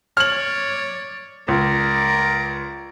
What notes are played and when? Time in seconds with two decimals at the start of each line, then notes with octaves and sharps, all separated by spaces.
0.17 C#5 D5 F6 F#7
1.48 C#2 A#4 D5